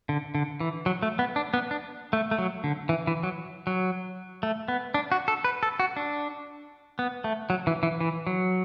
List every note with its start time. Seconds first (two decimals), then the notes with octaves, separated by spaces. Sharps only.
0.09 D3
0.35 D3
0.60 E3
0.86 F#3
1.03 A3
1.19 B3
1.36 D4
1.54 B3
1.71 D4
2.13 A3
2.31 A3
2.38 F#3
2.64 D3
2.89 E3
3.07 E3
3.23 F#3
3.67 F#3
4.43 A3
4.68 B3
4.94 D4
5.12 F#4
5.28 A4
5.44 B4
5.63 A4
5.80 F#4
5.96 D4
6.99 B3
7.24 A3
7.50 F#3
7.67 E3
7.83 E3
8.00 E3
8.27 F#3